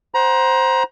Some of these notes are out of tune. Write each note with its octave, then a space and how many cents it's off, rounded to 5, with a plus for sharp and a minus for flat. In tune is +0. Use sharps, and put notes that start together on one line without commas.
C5 +0 F#5 +25 A#5 +30